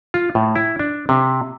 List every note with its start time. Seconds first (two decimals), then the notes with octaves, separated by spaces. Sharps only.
0.14 F4
0.35 A2
0.56 E4
0.79 D4
1.09 C3